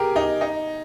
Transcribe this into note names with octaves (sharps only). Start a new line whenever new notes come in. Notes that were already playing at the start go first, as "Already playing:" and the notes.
Already playing: G4 G#4 A#4
D#4
D#4